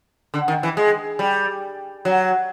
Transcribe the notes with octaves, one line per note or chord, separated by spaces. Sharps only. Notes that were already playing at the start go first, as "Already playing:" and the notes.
D3
D#3
E3
G#3
G3
F#3